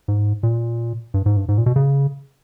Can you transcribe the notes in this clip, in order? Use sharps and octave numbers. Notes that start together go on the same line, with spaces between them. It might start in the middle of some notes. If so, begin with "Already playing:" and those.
G#2
A#2
G2
G#2
G2
G#2
A#2
B2
C#3